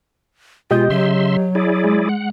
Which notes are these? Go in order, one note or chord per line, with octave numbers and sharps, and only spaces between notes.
B2 G#3 F4 G4 D#5 G6
C#3 F#3 E5 C6
E4 G#4 D5
G#3
F#5